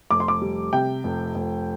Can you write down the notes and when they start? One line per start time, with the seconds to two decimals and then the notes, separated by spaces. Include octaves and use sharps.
0.11 F1 D6
0.20 C6
0.28 D6
0.42 G3
0.73 C3 G5
1.04 F1
1.35 F1